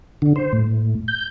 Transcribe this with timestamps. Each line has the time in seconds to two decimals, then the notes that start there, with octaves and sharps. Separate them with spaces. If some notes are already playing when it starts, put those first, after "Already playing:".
0.22 D3
0.36 C5
0.53 A2
1.08 G6